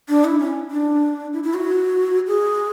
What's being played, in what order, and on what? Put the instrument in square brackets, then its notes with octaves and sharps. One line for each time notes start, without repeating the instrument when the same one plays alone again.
[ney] D4
E4
C#4
D4
E4
E4
F#4
G#4